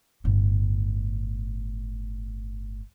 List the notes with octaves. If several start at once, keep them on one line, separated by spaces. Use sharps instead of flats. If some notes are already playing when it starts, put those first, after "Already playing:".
G1 A2